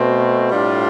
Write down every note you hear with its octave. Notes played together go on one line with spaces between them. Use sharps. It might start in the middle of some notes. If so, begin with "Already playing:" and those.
Already playing: B2 A3 C4
A2 G3 D4 F4